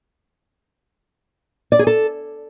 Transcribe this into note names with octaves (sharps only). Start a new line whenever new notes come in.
D5
G#4
A4